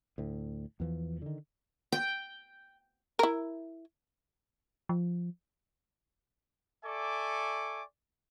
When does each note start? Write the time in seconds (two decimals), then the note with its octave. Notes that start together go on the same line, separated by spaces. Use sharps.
0.18 D2 A2
0.80 E2 E3 F3
1.22 D3 D#3
1.92 G5
3.19 E4 A#4
4.89 F3
6.84 A4 D5 E5 G#5 C#6 D6